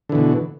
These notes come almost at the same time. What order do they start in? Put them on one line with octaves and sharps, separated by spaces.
D3 E3 B2